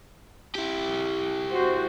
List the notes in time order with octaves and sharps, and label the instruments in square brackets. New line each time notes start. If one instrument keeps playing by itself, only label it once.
[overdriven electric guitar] E4 G4
[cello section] F#4 C5